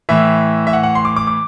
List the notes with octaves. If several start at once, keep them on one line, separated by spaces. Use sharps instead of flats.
A2 E3 E5
E5
F#5
F#5
C6
D6
D6
D6